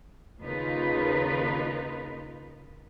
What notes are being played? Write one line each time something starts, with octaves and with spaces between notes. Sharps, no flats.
D#2 C#3 D#4 F4 A#4 B4